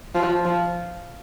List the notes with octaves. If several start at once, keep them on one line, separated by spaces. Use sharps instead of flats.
F3
F3